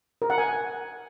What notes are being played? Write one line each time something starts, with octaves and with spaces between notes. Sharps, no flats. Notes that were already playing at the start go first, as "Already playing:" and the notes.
A#4
F#5
G#5